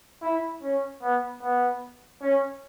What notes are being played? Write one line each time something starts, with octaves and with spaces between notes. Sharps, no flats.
E4
C#4
B3
B3
C#4